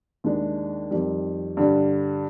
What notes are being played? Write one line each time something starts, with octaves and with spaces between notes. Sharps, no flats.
D#2 D#3 G#3 D4
F2 D#3 G3
G2 D3 G3